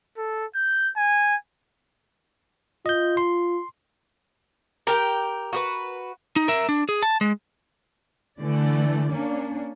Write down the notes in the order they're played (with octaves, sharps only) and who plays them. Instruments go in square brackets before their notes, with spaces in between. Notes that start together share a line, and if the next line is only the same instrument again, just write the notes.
[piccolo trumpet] A4
G6
G#5
[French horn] F4 [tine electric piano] D#5 G6
[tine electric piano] C6
[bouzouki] G4 G5 [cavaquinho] A#4
[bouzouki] F#4 G4 B4
[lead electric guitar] D#4
A#4 E5
D4
G#4
A5
G#3
[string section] D3 E3 A3 D5
A#3 C#4 D4